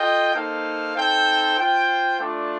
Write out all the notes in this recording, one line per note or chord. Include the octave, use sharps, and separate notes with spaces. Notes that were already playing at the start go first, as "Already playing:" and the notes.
Already playing: F4 A4 D#5 G5
A#3 D#4 A4 C5 F5
C4 D#4 A4 C5 G5
F4 C5 G5
A3 D4 F4 A4 D5